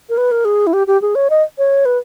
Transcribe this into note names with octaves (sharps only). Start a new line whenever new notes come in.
A#4
B4
A#4
G#4
E4
G4
G4
G#4
C#5
D#5
C#5
B4